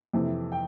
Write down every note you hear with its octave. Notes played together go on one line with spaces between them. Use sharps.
F2 C3 E3
G5